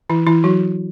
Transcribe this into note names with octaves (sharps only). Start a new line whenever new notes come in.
E3 E4
E3 E4
F#3 F#4